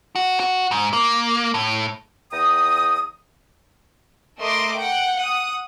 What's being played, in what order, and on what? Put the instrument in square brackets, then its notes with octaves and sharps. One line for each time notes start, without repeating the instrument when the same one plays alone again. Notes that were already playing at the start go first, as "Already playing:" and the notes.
[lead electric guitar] F#4
F#4
G#2
A#3
A2
[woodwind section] E2 G5 A#5 D#6
[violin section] A3 A#4 D#5 C6 D6
F#5 G5
F#5 D#6